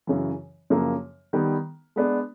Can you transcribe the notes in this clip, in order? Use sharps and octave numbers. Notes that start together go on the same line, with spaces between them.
F#2 C#3 E3
F#2 C#3 F3 A#3
D#3 G3 B3
G#3 B3 D4